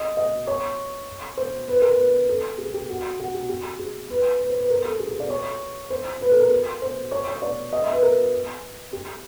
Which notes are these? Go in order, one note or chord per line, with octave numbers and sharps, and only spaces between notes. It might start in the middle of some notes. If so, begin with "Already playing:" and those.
Already playing: D#5
D#5
C#5
C5
B4
A#4
B4
A4
G#4
G4
F#4
F#4
G4
G4
G#4
B4
B4
C5
B4
A#4
A4
G#4
G#4
D5
C#5
C5
B4
A4
A#4
C5
C#5
C#5
D5
D#5
E5
B4
A#4
G4